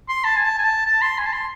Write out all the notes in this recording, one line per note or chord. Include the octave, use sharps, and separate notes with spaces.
C6
A5
G#5
A5
G#5
A5
A5
C6
G#5
A5
C6